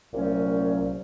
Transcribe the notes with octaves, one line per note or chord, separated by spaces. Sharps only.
C2 A#2 F#3 A3 C#4